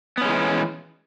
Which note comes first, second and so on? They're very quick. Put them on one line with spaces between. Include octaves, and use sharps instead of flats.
B3 C#4 G#3 E3